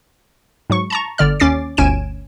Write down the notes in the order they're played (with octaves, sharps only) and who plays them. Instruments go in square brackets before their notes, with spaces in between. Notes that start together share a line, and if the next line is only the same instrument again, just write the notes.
[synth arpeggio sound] G#2 F#3 C#6
A5 A#5 C#6
G1 D3 D5 F6
D#2 C#4 D6 A6 C7
G1 D2 C#4 G#5 D7 E7